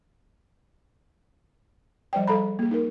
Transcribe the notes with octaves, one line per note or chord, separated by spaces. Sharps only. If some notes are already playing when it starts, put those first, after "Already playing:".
F3 G3 C5 D5 G5
G3 G#4 A4 F5 A#5 B5
A#3 G#4
D#4 A#4